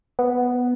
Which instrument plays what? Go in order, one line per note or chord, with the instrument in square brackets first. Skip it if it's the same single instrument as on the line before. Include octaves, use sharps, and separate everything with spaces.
[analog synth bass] B3